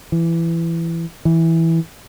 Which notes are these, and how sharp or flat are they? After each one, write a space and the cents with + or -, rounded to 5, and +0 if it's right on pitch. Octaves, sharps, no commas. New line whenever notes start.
E3 +15
E3 -5